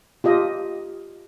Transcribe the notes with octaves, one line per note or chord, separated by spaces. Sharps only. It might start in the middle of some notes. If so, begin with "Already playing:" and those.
F4 G4 D#5